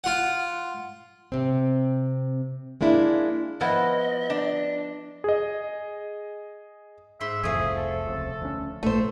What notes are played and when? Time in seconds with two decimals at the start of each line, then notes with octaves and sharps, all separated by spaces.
0.04 F4 F#5
1.32 C3 C4
2.81 G#3 A#3 D4 E4
3.61 F3 B3 E4 D#5
4.30 D4
5.24 G#4 D#5
7.21 G#2 E5 B5 C6
7.43 E1 C2 F2 F3 A3 G#4
7.77 A4
8.06 D#1 C#2 C3
8.42 D2 C#4
8.83 A1 A#2 A3 A4 C5